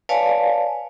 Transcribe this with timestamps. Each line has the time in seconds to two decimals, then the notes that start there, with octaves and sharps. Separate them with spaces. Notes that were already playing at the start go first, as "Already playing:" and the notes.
0.09 B4 C#5 D5 F5 G#5 A5